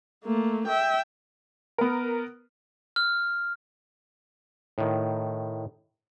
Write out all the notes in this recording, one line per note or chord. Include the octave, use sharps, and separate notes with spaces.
A3 A#3
E5 G5
B3 A#4
F6
A2 D#3